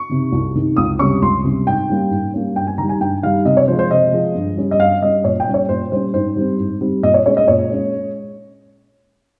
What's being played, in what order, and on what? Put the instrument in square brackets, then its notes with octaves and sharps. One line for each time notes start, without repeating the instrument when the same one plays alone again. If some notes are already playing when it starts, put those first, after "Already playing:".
Already playing: [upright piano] C#6
C3 D#3
C2
C3 D#3
C#2 D#6
C3 G3 C#4 C#6
C#2 C6
C3 G3 C#4
G#2 G5
G3 A#3 C#4
G#2
G3 A#3 C#4
G2 G5
G#5
D#3 A#5
G3
G#5
G2 G5
D#3 G3 F5
C3 D#5
C#5
F3 G#3 C5
C5
C3 D#5
F3 G#3
G2
G3 C#4
D#5
G2 F5
G3 C#4 D#5
A#2 C#5
G5
G3 C#4
C#5
A#2 C5
G3 C#4 C5
G#2 C5
G3 C4
G#2
G3 C4
A#2 D#5
C#5
G#3 C#4 C#5
D#5
A#2 C#5
G#3 C#4